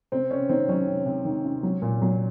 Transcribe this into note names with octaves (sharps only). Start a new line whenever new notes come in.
C3 C4
C3 C#4
D#3 C4
F#3 C#4
C3
C3
D#3
C3
F#3
A#2
F#3